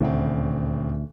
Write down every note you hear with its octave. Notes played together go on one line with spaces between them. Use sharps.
D#1 D2 C#3 C4